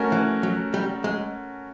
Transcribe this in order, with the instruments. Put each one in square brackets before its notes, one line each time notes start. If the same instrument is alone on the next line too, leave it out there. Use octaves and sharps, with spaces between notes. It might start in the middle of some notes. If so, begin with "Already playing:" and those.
Already playing: [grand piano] A3 C#4 F#4 A#4
[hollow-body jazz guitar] E3
F#3
G3
G#3